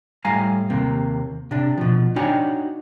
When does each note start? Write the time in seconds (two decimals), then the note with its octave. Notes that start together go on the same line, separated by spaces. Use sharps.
0.25 A2 G3 F5 G#5 A#5
0.70 D#2 C3 A#3
1.51 C3 D4
1.78 B2 F3
2.16 D4 D#4 F#4 C#5 G5 G#5